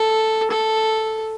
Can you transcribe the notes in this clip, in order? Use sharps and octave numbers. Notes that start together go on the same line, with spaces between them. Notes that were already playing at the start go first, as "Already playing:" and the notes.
Already playing: A4
A4